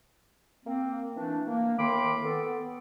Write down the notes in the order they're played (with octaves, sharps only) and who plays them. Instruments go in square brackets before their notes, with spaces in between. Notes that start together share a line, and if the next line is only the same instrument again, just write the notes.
[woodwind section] A#3 C4
E3 A3 D4
A#3
A2 D#3 G5 B5 C6 D6
B3 A4